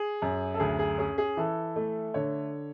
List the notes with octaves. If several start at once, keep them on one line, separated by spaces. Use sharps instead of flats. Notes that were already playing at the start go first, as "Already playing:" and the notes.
Already playing: G#4
F#2
A4
D2 G#4
G#4
C#4 G#4
G#4
E3 A4
A3
D3 C#5